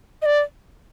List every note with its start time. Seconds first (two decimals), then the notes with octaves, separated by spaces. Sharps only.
0.22 D#5
0.26 D5